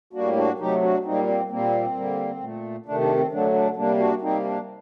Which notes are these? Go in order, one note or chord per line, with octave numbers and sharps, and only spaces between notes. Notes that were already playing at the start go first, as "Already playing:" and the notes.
A2 G3 A#3 D4 F#4
D4 F#4
C3 F#3 A3 D#4 G4
D4 F#4
A#2 G3 A#3 C4 D#4
C4
A#2 G3 A#3 C4
D3 G3 A#3
A#2 A3
C3 D#3 A3 D4
D4
C4
D3 F#3 A3 D4
D4
C3 G3 A#3 D4
D4 F#4
C3 G3 A#3 C4 D#4
D4